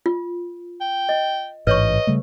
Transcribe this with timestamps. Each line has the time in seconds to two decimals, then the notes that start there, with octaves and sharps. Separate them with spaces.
0.06 F4
0.81 G5
1.09 D#5
1.67 A1 G#2 B4 C#5 D#5 C#6
2.07 C#3 G3 A3